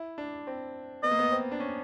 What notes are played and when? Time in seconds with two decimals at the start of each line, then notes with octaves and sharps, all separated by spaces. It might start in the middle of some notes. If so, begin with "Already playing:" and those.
Already playing: E4
0.18 D4
0.47 C4
1.03 B3 D#5
1.11 A#3
1.19 B3
1.32 C4
1.51 D4
1.60 C#4